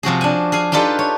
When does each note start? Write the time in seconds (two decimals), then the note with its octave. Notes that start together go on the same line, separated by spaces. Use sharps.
0.03 C3 F3 F#4 G#4
0.21 D4 G#5
0.52 G#4 F5 G#5
0.72 D4 D#4 F4 G4 A4 B4
0.99 C#5